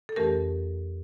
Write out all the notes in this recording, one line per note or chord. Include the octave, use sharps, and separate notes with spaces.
A4
F2 E3 A3 C#4 G4 A#4